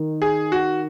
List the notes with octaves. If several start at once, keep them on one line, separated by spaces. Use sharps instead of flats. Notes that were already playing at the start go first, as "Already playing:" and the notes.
Already playing: D#3
G#4
F#4